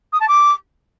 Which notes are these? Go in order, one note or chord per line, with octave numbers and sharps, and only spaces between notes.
D#6
A5
D6